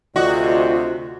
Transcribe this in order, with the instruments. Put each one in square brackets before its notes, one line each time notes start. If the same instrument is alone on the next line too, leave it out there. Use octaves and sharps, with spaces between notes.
[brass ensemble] D2 C3 [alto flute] F4 [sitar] F#4 [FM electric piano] D5 D#5